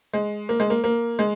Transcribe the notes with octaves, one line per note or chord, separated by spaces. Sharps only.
G#3
A#3
G#3
A#3
A#3
G#3